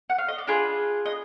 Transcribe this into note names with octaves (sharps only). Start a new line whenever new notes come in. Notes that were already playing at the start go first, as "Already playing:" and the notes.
F#5
F5
D#5
D5
D4 F4 G#4 B4
D#5